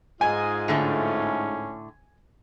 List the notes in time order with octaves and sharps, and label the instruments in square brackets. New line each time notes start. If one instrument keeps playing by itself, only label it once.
[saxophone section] G#2 F4 [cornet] D#5 [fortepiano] G#5
[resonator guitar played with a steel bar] A2 D3 A3 [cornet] C#4